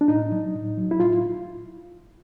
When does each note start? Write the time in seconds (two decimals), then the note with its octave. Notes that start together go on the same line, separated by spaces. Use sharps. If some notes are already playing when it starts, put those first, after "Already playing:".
0.01 D4
0.08 A2 D#4
0.32 F#3
0.55 A2
0.78 F#3
0.91 E4
0.99 A2 F4